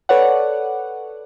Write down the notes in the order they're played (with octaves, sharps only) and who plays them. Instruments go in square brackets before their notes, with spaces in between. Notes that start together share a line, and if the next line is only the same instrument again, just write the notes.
[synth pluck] A4 B4 C#5 D5 F#5